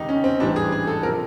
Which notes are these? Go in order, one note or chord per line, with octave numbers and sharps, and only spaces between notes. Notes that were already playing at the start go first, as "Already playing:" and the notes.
Already playing: C#2 C3 D#3 D#4
C#4
C4
A1 G#2 E3 G3 D4
G#4
G#4
A4
C3 F3 A#4